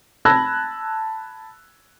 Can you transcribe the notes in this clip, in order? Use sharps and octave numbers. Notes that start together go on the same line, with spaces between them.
A5 B5 E6 F#6 G#6 A#6